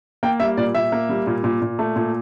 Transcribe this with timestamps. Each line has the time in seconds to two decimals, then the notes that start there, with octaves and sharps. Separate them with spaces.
0.23 A#3 G5
0.40 G3 E5
0.57 A#2 D5
0.75 A#2 E5
0.92 A#3
1.09 G3
1.27 A#2
1.44 A#2
1.62 A#2
1.79 A3
1.96 A#2